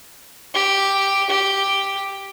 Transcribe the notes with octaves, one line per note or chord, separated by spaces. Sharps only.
G4
G4